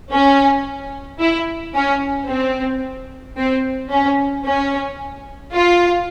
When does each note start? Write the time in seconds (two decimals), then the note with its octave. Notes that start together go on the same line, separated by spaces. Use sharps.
0.12 C#4
1.20 E4
1.75 C#4
2.29 C4
3.37 C4
3.91 C#4
4.45 C#4
5.54 F4